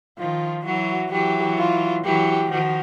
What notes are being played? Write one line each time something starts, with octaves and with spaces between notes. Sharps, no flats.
D#3 F3 F4
E3 F#3 F#4
E3 F#3 G4
F4
E3 F#3 G4
D#3 F3 F#4